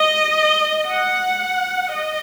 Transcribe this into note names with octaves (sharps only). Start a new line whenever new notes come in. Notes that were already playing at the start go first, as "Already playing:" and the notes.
Already playing: D#5
F#5
D#5